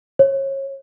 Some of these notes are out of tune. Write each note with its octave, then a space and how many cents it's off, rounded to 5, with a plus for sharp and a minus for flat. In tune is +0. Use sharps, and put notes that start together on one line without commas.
C#5 -30